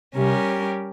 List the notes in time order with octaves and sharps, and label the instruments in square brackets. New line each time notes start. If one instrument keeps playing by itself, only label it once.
[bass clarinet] C3 [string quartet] G3 C#4 G4 A#4